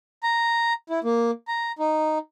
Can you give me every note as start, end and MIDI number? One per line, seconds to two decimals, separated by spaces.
0.23 0.73 82
0.90 0.99 64
1.04 1.31 58
1.48 1.72 82
1.79 2.18 63